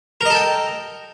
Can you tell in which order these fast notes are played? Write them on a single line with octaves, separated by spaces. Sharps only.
A#4 D#5 A4 G5